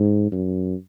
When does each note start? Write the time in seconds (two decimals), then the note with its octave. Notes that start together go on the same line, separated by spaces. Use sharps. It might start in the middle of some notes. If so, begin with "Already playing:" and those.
Already playing: G#2
0.32 F#2